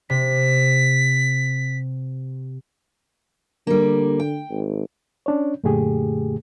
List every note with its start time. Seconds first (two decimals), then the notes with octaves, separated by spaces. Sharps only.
0.10 C3 B6
3.67 D3 G3 A#3
4.20 G5
4.51 G#1
5.26 C#4 D4 C#5
5.64 F#2 A#2 D3 A3 G4 G#4